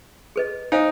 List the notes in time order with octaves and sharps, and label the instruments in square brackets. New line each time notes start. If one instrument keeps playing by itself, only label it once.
[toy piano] G#4 B4 D#5
[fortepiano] D#4 [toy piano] C5 F5 G#5